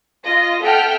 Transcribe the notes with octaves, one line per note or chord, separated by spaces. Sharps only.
F4 D#5 A#6
A4 E5 F#5 G5 F6